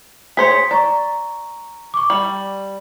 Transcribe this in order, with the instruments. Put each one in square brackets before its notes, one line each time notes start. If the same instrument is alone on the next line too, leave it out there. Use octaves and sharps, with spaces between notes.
[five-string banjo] G#4 C5 C#5 [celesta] B6
[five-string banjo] D5 [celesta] A#5 C#6
[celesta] C#6 D6
[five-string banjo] G3 [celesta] F#7